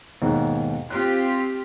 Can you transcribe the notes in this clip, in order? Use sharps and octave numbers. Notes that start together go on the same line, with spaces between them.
D#2 G#2 B2
C4 F4 G4 F#6